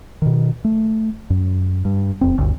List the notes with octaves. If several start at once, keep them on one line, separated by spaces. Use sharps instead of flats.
B2 D#3
A3
F#2
G2
D#1 F2 C4
G1 D2